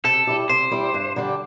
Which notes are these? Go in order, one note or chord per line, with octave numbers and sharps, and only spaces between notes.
C3 A4
G3 E4 G4
C3 C5
G3 E4 G4
G2
D3 G3 D4 G4